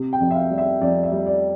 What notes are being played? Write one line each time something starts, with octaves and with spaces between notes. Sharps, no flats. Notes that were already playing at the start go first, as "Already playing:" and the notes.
Already playing: C3
G5
F2
E5
F5
G3
E5
F2 D5
E5
G3
D5